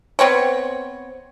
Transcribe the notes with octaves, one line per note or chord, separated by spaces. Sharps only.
B3 C4 C5 C#5